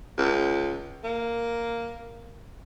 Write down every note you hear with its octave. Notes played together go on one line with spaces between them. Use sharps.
C#2
A#3